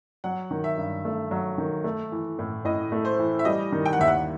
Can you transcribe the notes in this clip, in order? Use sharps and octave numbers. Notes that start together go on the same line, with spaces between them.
F#3 F#5
D#3
E5
G2
A3
F#3
D#3
A3
E3
A2
A2 D#5
A3
C5
E3
E5
G3 D#5
D#3
G5
F#5
D#2 E5
F#5